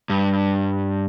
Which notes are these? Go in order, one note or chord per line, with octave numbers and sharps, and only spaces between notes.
G2